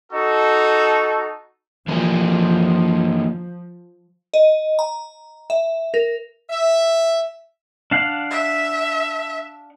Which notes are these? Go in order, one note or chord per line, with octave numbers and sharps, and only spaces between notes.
D#4 F#4 A4
E3 F3 A#3 F#4
D#5
A#5
E5
A#4
E5
D4 F5 F#5
E5